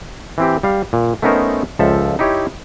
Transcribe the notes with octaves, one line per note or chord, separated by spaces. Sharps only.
E3 C4 G4
G3 F5
A#2
A3 B3 C#4 D#4 A#4 C5
C#2 F3 A4 E5
D#4 E4 G4 C#5